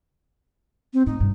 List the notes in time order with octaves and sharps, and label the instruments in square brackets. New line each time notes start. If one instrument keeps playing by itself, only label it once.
[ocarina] C4
[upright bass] A2 [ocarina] D#4
[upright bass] B1 G2